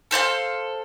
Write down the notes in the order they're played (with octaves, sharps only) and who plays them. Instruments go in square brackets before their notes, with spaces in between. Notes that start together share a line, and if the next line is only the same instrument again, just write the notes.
[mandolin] A4 C5 D5 F5